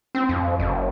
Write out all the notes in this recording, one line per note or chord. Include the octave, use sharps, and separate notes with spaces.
C4
F2
F#1